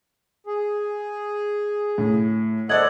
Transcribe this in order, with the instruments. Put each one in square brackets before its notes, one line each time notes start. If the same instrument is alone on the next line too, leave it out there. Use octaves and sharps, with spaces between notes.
[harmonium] G#4
[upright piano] A2
[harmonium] A4 F#5 [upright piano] C5 D5 D#5 [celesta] G#6 F#7